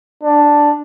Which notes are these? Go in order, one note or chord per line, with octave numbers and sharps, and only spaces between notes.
D4